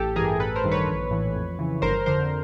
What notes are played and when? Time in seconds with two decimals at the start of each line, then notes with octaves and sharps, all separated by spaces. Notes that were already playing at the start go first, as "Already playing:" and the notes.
Already playing: A1 G4 A4
0.16 G2 E3 G#4 A#4
0.40 A1 A4 B4
0.56 A#4 C5
0.64 G2 D#3
0.72 B4 C#5
0.88 A#1
1.11 A2 E3
1.35 F2
1.59 C#3 E3
1.82 G1 A#4 C5
2.06 F2 D3 A#4 C5